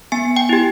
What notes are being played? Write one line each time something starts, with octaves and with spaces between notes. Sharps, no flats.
B3 G#5
G5
E4 G4